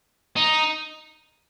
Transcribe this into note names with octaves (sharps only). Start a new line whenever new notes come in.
D#4